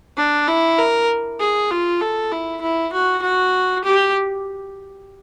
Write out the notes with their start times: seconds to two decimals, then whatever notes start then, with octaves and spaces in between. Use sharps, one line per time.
0.17 D4
0.48 E4
0.78 A#4
1.40 G#4
1.71 F4
2.01 A4
2.32 E4
2.61 E4
2.93 F#4
3.22 F#4
3.84 G4